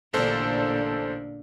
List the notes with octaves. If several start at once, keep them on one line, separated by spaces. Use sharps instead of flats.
A1 A#2 D3 D4 A4 C5